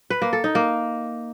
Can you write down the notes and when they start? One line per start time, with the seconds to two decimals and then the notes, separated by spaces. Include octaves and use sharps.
0.10 B4
0.22 A#3
0.33 A4
0.44 D#4
0.55 A#3